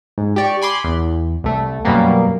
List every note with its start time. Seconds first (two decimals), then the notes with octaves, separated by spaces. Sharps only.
0.18 G#2
0.36 G4 D5 C#6
0.62 G#5 B5 C6 D6
0.84 E2
1.44 C2 A3
1.85 F#2 B2 F#3 G3 A#3 B3